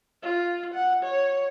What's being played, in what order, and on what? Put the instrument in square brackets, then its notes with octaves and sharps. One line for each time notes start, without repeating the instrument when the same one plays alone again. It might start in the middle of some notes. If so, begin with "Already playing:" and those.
[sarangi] F4
F#5
C#5